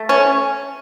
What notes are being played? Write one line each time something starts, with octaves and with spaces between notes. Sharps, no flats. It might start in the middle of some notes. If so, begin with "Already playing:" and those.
Already playing: A3
C#4